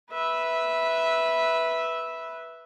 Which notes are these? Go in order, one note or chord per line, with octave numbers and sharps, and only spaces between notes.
B4 E5